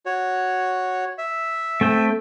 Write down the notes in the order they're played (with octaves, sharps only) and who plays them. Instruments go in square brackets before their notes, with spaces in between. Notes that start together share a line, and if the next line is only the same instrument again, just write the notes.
[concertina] F#4 C#5
E5
[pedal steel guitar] A3 C4 G5